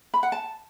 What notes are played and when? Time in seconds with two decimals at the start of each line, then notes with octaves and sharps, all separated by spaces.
0.14 B5
0.23 F#5
0.32 A5